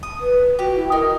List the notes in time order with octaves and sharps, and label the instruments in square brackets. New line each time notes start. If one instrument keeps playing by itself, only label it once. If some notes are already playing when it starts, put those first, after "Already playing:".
[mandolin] D#6
[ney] B4
[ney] F#4 [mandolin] G4
[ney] E4
[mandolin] D#4 [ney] A#4